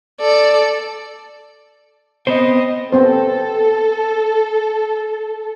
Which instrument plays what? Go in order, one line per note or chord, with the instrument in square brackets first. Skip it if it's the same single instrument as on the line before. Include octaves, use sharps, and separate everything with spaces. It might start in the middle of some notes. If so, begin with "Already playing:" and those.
[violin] A4 D5
[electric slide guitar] B3 C4 C5 [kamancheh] D#5
[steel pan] B3 C4 C5 [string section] A4